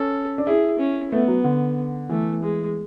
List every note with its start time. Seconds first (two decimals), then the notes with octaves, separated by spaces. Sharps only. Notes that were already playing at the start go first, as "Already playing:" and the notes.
Already playing: C#4 A4
0.38 D4
0.46 E4 G#4
0.79 C#4
1.11 A3 B3
1.28 F#3
1.44 D3
2.09 E3 A3
2.43 G#3